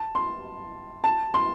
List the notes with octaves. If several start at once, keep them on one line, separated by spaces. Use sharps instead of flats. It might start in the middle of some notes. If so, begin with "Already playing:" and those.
Already playing: A5
C6
A5
C6